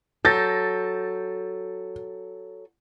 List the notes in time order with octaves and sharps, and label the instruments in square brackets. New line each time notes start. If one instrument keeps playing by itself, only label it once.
[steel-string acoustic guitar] F#3 A4 [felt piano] G6 A6 A#6